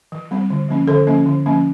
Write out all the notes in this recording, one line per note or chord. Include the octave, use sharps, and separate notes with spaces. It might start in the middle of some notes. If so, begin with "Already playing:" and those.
E3
G3 C4
D3
F3 A#3 C#4
D3 A4
F3 A#3 C#4
D3
F3 A#3 C#4